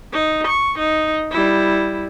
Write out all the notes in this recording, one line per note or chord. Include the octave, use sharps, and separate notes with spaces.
D#4
C#6
D#4
G3 E4